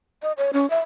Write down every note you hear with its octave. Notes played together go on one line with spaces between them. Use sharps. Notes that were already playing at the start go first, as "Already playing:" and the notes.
D#5
C#5
C#4
E5